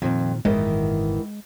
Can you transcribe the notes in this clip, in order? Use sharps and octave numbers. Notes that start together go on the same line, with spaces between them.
F2 A#2 D#3
G#1 F#2 A#2 D#3 E3 G#3 B3